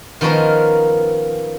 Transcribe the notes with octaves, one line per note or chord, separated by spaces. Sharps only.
D#3 F3 B3 C#4 A#4 C5